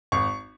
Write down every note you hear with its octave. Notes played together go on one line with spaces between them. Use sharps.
G#1 C#6